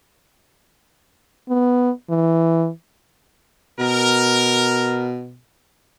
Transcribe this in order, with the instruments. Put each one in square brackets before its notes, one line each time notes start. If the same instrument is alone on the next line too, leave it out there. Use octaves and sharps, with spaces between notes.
[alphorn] B3
E3
[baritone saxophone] B2 [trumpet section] A#4